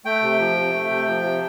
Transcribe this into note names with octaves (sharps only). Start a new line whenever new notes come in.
A3 G5
C3
F3
C3
A3
C3
F3
C3